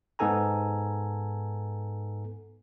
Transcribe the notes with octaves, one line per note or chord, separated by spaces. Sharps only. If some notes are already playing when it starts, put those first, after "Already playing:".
G#2 B3 D#4 A4 G#5 A#5